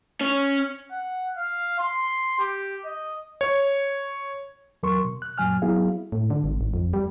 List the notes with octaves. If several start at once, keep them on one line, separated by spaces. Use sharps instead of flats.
C#4
F#5
F5
C6
G4
D#5
C#5
E2 F#3 A#4 C6 C#6
B2
F#6
F#2 A#2 F#3 G#5 F6
F#3 B3 E4 G#4 F5
A2
D3
G#1
G#1
F2
G3